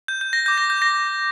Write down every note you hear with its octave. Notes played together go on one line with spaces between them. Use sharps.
G6
G6
A#6
D6 G6
A#6
G6
A#6